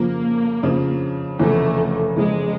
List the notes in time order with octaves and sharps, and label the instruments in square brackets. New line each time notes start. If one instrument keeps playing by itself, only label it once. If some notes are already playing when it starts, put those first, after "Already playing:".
Already playing: [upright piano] F2 C#3 F3 [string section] A#3
[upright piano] F2 C#3 F3
[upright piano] F1 E2 C#3 E3 [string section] A3
[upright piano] F1 E2 C#3 E3 [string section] G#3